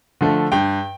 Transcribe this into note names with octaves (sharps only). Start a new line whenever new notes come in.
D3 F3 A3
G2 G5